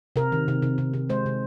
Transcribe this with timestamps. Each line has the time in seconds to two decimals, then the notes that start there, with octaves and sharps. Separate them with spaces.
0.16 C3 A#4
0.32 D#3
0.48 C3
0.62 C3
0.78 C3
0.94 C3
1.09 G#3 C5
1.26 C3